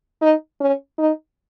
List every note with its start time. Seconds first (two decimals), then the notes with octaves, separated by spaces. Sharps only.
0.21 D#4
0.60 C#4
0.98 D#4